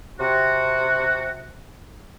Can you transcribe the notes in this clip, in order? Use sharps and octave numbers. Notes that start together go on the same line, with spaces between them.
C3 F#4